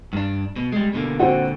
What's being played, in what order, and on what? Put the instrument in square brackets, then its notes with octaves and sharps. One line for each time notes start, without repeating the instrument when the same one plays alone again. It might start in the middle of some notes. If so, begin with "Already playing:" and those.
[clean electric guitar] G2 D4
B2
G3 G#3
B2 D3 A#3
[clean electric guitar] A#2 D3 [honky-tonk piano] C4 F#4